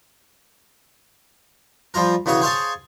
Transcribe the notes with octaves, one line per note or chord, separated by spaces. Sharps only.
F3 G3 F4 A#4
E2 C#3 F#4 C#5 D#6
G#4 C5 C#5 F5 G#5 A5